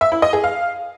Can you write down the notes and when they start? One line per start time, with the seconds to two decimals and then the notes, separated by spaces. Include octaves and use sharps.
0.01 E5
0.12 E4
0.22 D#5
0.33 G#4
0.44 F5